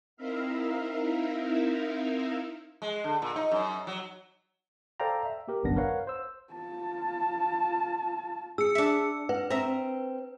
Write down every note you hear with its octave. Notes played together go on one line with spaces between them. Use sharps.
C4 D#4 E4 A#4 E5 F5
G#3
D3
A#2
D#4
F#2
F#3
A4 C5 D5 F5 G5 A#5
E5
A#3 G4 A#4
G1 C2 F#2 B3 D4 A#6
A#4 B4 C#5 F5 F#5
C5 E6
F4 A5
G#4 E6 C#7
D4 E5
B4 F#5
C4 E5 A#5